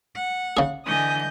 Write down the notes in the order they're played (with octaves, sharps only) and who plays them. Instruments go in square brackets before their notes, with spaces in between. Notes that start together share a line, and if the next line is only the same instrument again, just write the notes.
[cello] F#5
[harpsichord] C#3 G#4
[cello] D3 E3 [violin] D#5 G6 [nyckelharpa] G#5 D#6